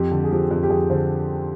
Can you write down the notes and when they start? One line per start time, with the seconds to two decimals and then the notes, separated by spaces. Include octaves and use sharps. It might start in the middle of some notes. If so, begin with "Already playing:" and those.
Already playing: F2 G4
0.11 D3
0.24 G#4
0.31 F3 G4
0.51 F2
0.63 G4
0.70 F2 G#4
0.90 D3 C5